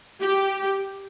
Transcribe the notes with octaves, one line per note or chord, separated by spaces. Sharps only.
G4